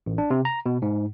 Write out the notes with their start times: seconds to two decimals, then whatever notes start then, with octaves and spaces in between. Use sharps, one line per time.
0.06 A1
0.18 D4
0.30 C3
0.45 A#5
0.66 B2
0.82 G#2